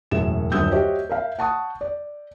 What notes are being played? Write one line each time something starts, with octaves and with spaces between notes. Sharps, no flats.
E1 F#2 A2 E7
D#1 F#2 D3 D#6 E6 G6
F#4 G4 C5 C#5 D#5 E5
A#4 E5 F5
F#5 A5 C#6 D#6
D5